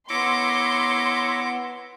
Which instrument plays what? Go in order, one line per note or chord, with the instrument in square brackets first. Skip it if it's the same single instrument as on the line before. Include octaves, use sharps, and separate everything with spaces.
[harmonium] B3 [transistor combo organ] E4 C#5 A#5 [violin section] C6 [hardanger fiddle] D6